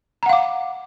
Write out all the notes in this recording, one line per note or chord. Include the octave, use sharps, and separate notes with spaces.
F5 F#5 A#5 D6